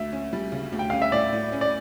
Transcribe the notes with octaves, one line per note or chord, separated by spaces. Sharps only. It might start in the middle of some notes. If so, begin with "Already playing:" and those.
Already playing: D2 E5
C#4
G3
C#3
D2
G5
C#4 F5
E5
A2 D5
A2
C#4
D5